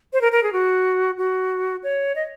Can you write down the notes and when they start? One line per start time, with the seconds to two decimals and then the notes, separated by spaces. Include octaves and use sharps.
0.13 C5
0.21 A#4
0.32 A#4
0.43 G#4
0.53 F#4
1.18 F#4
1.83 C#5
2.16 D#5